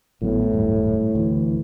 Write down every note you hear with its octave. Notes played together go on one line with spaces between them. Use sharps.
G#1 A2 F#3 B3
D#1 G2
D2 E3